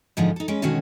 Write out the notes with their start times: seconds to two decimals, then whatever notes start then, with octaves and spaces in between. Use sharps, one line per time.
0.17 G#2 D3 F3 B3 D#4
0.36 D#4 A4
0.48 G#3 C#4 B4
0.62 B2 D3 D#3 G#3 C#4 F#4